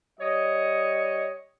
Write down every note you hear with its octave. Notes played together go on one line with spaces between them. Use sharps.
G3 C#5 D#5